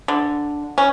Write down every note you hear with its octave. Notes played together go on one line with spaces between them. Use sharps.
D3
C#4